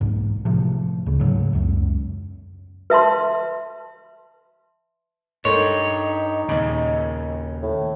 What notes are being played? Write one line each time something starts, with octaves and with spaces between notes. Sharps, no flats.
B1 G#2
A2 C3 F3
D2 C#3
G#2 C#3 F#3
C#2 F#2
B4 E5 A5 C6
G2 D#4 A4 A#4 C#5 C6
D#2 A#2 C#3 D#5
A2